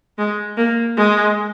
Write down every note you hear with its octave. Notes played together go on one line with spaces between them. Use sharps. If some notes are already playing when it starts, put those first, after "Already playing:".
G#3
A#3
G#3